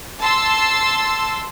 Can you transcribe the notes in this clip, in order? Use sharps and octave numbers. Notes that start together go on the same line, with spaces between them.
A5 C6 E6